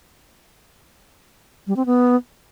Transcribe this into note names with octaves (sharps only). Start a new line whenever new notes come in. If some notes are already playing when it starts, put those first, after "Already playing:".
G3
C4
B3